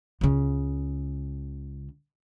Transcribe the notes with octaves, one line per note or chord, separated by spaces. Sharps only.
C#2 C#3